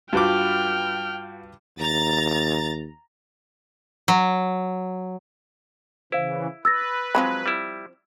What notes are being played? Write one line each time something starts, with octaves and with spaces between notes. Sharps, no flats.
G2 F4 F#4 B4 G5 D6 F6
D#2 A#5 A6
F#3
C#3 E3 E4 C5 F5
B4 E6 A6 A#6
F3 F#3 G#3 C4 B5
G3 E4